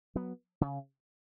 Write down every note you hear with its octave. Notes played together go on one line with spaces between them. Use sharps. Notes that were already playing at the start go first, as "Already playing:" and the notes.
F#3 B3
C#3